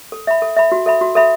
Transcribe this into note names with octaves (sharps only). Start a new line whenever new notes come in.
A4
E5 B5
A4
E5 B5
F#4
A4 E5 B5
F#4
A4 E5 B5